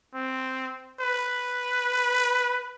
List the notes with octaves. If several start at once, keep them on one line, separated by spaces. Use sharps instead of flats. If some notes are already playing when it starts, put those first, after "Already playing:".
C4
B4